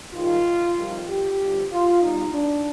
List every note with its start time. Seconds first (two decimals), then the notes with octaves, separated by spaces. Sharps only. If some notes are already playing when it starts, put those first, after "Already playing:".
0.14 G#2 D#3 G3 F4
0.77 F2 D#3 G3
1.08 G4
1.40 G2 D3 F3
1.71 F4
2.02 B2 G3 D#4
2.33 D4